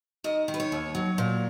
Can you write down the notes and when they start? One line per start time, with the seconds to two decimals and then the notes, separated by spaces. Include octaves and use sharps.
0.24 D#3 D#5
0.48 D#3
0.54 B4
0.60 C#5
0.72 D#2
0.95 F#3
1.18 A#2